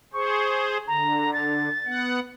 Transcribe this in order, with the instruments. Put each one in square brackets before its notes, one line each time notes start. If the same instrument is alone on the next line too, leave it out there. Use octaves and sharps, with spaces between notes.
[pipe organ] G#4 C5 [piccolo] C#6
[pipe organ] D3 [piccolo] A#5
[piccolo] A6
[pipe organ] B3 F#5